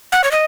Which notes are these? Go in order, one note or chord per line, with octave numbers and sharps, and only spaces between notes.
F#5
C#5
D#5